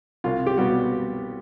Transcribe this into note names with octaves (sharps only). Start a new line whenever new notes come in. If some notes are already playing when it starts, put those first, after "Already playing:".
C2 F4
G4
B2 G3 B3 F#4